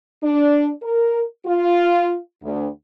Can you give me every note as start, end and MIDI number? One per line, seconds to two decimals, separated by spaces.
0.23 0.70 62
0.82 1.23 70
1.46 2.18 65
2.43 2.68 38